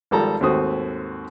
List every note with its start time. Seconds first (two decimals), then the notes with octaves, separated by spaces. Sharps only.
0.11 G#1 F3 G3 A4 A#4 A#5
0.41 D#2 G#2 A3 C4 F#4 D#6